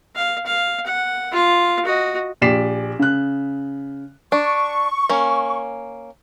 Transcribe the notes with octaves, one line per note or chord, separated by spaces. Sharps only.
F5
F5
F#5
F4 F5
F#4 D#5
A#1 G4 D5 B6 C7 E7
C#3 F#6
D4 C#6
A#3 C#4